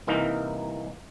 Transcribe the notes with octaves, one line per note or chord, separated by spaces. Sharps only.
C2 E3 A#3 D#4 A#4